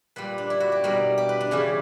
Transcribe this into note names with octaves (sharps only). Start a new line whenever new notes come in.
A#2 G3 B4
D4
E4
F#4
G4
B2 G3 A#4
G4
B4
D4
C#3 E3 G3 C#4